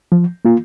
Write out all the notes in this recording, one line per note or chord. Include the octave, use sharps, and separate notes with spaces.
F3
A#3 F4